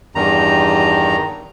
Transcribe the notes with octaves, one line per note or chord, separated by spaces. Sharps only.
E2 G2 D#3 A#5